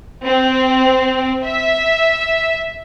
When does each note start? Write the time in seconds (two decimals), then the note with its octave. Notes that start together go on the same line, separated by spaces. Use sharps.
0.25 C4
1.47 E5